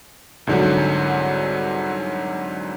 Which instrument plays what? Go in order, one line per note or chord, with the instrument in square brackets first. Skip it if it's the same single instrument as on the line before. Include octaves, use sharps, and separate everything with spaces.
[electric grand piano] C2 G#2 D3 F#3